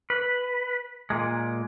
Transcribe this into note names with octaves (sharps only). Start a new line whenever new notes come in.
B4
A#2 G#3